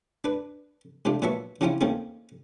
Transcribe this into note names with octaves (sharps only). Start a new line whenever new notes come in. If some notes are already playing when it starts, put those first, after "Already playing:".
D4 B4
C3 A3 D4 F4
A#2 F#3 B3 E5 A5 C#6
C#3 F3 C4 C#4 E4 F4
D#3 A3 A#3 C4 C#4 G#4